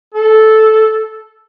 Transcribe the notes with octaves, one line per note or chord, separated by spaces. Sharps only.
A4